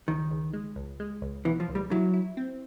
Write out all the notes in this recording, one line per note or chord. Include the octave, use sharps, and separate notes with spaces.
C#2 D#3
C#2
G#3
C#2
G#3
C#2
B2 E3
F3
C#2
G3
F#3 E4
E4
C4